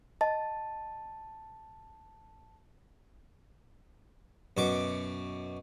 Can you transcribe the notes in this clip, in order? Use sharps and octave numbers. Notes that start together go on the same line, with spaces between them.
D#5 A5
F#2 B2 C#6 D6